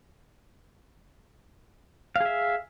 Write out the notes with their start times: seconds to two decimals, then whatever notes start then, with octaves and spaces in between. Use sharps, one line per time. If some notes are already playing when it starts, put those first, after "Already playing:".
2.16 F5
2.20 G#4
2.25 E5